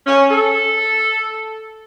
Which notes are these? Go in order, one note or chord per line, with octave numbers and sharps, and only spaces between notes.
C#4
A4